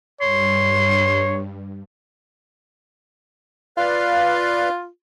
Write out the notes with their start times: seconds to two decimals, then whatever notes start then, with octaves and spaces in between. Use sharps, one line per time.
0.21 G2 C#5 C6
3.78 F4 B4 D5 F5